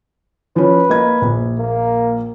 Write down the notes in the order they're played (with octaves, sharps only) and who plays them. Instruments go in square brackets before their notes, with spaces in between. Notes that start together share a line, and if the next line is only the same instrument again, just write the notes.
[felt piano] F3 C#4 [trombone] B4
[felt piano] A#3 D#5 G#6
A#1
[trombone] A#3